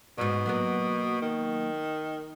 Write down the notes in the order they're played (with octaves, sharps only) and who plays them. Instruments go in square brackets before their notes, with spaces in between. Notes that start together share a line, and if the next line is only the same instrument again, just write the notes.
[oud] G#2 F#3 [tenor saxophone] B2
[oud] F#3 A#3 B3
[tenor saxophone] D#3